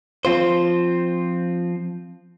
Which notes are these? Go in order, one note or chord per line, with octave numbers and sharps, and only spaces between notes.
F3 C4 F4 C5